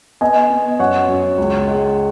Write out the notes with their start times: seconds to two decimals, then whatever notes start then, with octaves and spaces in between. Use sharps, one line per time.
0.21 B3 D#5 G#5
0.50 B3
0.79 F#2 C#5 F#5
1.08 F#2
1.38 C#2
1.67 G#3